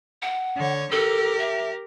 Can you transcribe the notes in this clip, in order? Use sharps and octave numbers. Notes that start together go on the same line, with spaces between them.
F#5
D3 C#5
G4 A4 A#4
E5